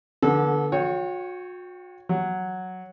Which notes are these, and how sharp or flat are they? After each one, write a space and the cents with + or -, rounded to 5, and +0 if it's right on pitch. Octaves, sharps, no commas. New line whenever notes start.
D3 +0 B3 -35 A4 -25
F#4 -40 C#5 +0 G5 +0
F#3 +0 F#5 +0